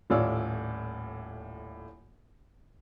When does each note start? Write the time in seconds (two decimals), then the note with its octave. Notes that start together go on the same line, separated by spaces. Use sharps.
0.10 D#1 A2 F4 C#5 D5 E6